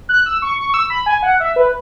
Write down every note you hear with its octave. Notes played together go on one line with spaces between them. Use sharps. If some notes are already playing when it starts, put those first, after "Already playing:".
F#6
E6
C#6
C#6
C#6
E6
B5
G#5
F#5
E5
B4